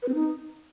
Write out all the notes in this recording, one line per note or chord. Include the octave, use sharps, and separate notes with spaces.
B4
C4
D#4